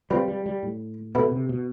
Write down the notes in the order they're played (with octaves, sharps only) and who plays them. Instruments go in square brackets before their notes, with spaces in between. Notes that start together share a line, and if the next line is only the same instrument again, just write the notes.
[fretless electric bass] G3 [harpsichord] C4 F4 B4
[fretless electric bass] G3
G3
A2
[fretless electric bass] B2 [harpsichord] E3 B3 E4 A4
[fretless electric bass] C3
B2